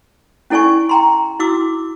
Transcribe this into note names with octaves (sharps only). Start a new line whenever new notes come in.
C#4 E4 A4 D5 G#5 C#6
G5 A#5 C6
E4 F#4 D6 E6